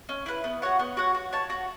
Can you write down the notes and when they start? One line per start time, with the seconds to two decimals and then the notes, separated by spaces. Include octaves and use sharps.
0.09 C#4
0.26 E4 B4
0.44 B3
0.62 F#4 C#5 F#5
0.79 B3
0.97 F#4 C#5 F#5
1.15 F#4
1.33 C#5 A5
1.50 F#4